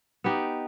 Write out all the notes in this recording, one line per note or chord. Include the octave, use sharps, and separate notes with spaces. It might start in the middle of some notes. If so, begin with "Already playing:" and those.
B3 D#4 G4